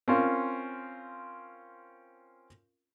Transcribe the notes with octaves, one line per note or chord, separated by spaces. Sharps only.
C4 C#4 F4 A#4